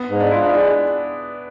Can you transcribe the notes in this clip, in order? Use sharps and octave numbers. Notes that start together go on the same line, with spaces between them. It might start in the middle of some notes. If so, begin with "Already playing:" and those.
Already playing: B3
G#2
D4
E4 F4
D4
G#3 D4